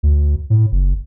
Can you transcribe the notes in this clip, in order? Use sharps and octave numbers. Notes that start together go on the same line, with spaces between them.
D2
A2
F#1